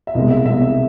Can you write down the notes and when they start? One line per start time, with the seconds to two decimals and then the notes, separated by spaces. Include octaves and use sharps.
0.07 E5
0.15 C2 B2 G#3 D#5
0.30 E5
0.46 C2 B2 G#3 E5
0.61 E5